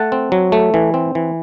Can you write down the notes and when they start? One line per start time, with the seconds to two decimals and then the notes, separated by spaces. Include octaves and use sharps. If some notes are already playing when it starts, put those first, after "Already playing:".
Already playing: A3 F#5 A5
0.12 C4
0.32 F#3
0.52 A3
0.74 E3
0.94 C4
1.15 E3